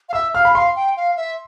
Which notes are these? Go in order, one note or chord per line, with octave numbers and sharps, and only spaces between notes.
F5
E5 E6
F5 F6
B5
F5 C6
G5
F5
E5